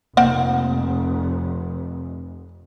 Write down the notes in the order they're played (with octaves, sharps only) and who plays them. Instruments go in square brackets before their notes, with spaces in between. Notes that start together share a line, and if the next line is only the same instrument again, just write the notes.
[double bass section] F1 [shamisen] A#3 C4 F#5